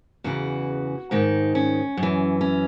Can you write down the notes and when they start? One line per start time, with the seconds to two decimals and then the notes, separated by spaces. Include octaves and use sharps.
0.24 E2 C#3 E3 F#4
1.11 G#2 D#3 D#4
1.55 C#4
1.97 F#2
2.03 E3
2.41 C#4